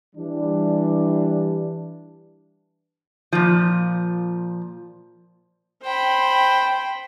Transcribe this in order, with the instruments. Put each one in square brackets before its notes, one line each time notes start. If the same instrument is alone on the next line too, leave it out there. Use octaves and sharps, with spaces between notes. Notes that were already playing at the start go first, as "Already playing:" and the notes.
[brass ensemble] E3 G3 D4
[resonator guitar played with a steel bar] A#2 F3
[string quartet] C5 G5 B5